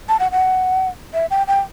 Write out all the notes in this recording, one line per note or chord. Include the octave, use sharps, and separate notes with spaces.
A5
F#5
F#5
E5
G5
G5